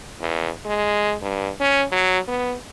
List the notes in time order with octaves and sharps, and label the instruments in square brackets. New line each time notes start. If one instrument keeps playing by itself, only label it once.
[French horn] E2
G#3
G2
C#4
F#3
B3